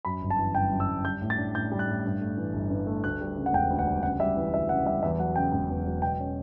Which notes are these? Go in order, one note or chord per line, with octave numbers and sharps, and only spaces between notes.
F#2 B5
G1
A5
E3
G1 G5
F#2
E6
G1
G3 G6
A2
A6
D4
A2 G6
G3
F#6
A2
G2
A3
E3
G1
G2
A3
D2 F#6
G3
C#3
F#5
E1 G5
D2
F#5
G3
C#3 F#5
G3 E5
E3
D2 E5
C#3 F#5
G3 E5
E2 E5
F#3 F#5
C#3 G5
E1 G5
E2
F#3
B2 G5
C#4